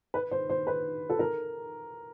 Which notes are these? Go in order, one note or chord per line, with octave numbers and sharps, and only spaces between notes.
B4
C5
C5
B4
A4
A#4